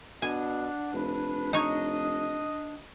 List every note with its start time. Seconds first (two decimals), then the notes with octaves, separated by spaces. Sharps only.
0.22 B2 D4 D5 F#5 G#5
0.93 F1 B4
1.53 D#4 C#5 D#5